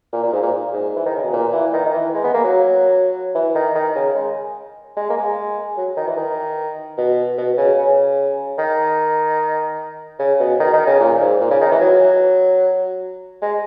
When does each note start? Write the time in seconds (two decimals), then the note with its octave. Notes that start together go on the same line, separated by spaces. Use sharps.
0.13 A#2
0.23 A#2
0.32 G#2
0.43 A#2
0.73 G#2
0.96 E3
1.06 D#3
1.15 C#3
1.24 B2
1.33 A#2
1.53 E3
1.73 D#3
1.85 D#3
1.94 E3
2.14 G#3
2.24 B3
2.34 A#3
2.44 F#3
3.35 E3
3.55 D#3
3.75 D#3
3.95 C#3
4.15 G#3
4.96 G#3
5.10 A#3
5.16 G#3
5.77 F#3
5.97 D#3
6.07 E3
6.17 D#3
6.97 B2
7.38 B2
7.57 C#3
7.78 C#3
8.58 D#3
10.19 C#3
10.40 B2
10.60 D#3
10.73 D#3
10.87 C#3
11.00 A#2
11.21 G#2
11.40 A#2
11.51 C#3
11.61 D#3
11.71 E3
11.81 F#3
13.42 G#3